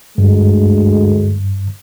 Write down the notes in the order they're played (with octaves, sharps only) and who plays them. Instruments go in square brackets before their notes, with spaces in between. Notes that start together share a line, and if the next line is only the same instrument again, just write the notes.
[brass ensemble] D2 G#3 [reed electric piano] G2